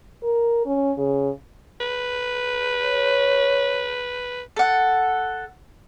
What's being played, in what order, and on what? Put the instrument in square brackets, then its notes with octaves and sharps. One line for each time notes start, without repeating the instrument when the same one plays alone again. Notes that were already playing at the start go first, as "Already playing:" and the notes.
[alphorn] A#4
C#4
C#3
[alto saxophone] B4
[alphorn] C#5
[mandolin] A4 F#5